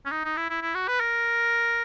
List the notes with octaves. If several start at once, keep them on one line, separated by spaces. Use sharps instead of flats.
C#4
D#4
D#4
E4
E4
E4
F#4
B4
A#4